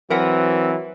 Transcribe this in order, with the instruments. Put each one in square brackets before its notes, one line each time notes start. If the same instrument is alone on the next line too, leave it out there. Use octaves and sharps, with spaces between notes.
[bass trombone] E3 [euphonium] F#3 [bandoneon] C4 [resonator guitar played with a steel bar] A#4 B4 F#5